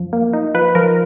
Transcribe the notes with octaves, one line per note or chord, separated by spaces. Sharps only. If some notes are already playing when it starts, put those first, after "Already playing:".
Already playing: F#2 F3
A#3
D#4
F3 B4
F3 A#4